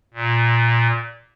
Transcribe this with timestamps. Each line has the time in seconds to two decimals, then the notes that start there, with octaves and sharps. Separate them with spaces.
0.14 A#2